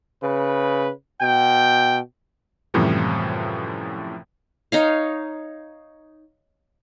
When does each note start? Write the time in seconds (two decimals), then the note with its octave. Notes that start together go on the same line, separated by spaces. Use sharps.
0.23 C#3 B4
1.21 B2 G5
2.74 F#2 A2 C3 E3 F3 G3
4.72 D#4 C#5 F5